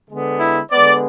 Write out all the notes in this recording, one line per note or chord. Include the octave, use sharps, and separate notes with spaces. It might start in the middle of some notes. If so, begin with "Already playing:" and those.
D3 G#3 B3
E4
D3 G#3 B3 D5